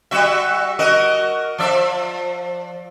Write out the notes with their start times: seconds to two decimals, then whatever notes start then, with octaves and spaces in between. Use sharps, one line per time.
0.11 G3 F#4 E5
0.79 F#4 A#4 D#5
1.58 F3 D5 E5